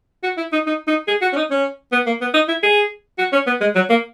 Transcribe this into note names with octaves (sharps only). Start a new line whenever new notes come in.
F#4
E4
D#4
D#4
D#4
G#4
F#4
C#4
D#4
C#4
B3
A#3
B3
D#4
E4
G#4
F#4
C#4
B3
G#3
F#3
A#3